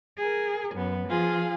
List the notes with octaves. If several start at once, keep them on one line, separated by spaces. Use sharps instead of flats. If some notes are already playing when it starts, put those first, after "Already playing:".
G#4 A#4
F#2 B3
F3 F4 G#4 F5